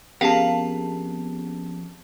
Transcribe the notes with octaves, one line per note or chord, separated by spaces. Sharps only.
F2 B3 C#4 G4 G#4 A#4 F5 A5